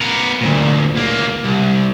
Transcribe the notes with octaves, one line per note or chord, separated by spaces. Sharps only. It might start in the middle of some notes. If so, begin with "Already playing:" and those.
B3 A#4
D2 A#2
C#2 A#3
C2